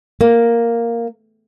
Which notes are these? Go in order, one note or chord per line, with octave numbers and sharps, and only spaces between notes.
A#3